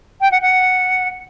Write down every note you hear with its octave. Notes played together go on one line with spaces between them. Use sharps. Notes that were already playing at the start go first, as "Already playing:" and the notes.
G5
F#5
F#5